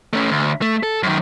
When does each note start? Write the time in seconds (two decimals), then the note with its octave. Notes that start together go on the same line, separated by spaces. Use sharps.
0.13 A3 C#4
0.30 D2
0.62 A3
0.83 A4
1.03 F#2 D#3